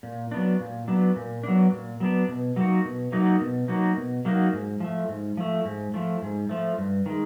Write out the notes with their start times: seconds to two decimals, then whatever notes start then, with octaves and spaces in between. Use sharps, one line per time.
0.03 A#2
0.32 F#3 B3 D4
0.60 A#2
0.88 F#3 B3 D4
1.16 A#2
1.43 F#3 B3 D4
1.72 A#2
2.00 F#3 B3 D4
2.28 B2
2.56 F#3 A#3 D#4 F#4
2.85 B2
3.12 F#3 A#3 D#4 F#4
3.41 B2
3.68 F#3 A#3 D#4 F#4
3.97 B2
4.25 F#3 A#3 D#4 F#4
4.53 G#2
4.80 F3 A3
5.09 G#2
5.37 F3 A3
5.65 G#2
5.94 F3 A3
6.22 G#2
6.49 F3 A3
6.78 G2
7.06 D#3 G#3